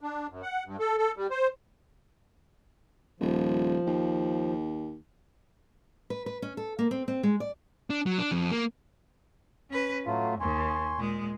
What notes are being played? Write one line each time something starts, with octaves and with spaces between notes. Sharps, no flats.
D4
F#2
F#5
G2
A4
A4
G3
C5
D#1 F3
D#2
B4
B4
C#4
A4
A#3
C4
C4
G#3
D5
D4
F#3
D4
F2
A#3
C#4 B4
A2 F#3 A3 F4
D#2 G#5 C6 C#6
A#2 G#3